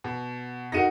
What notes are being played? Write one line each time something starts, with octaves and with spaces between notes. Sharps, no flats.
B2
D#4 F#4 A#4 A#6 C#7 D#7